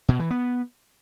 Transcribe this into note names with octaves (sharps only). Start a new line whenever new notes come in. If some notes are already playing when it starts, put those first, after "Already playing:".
B2
E3
B3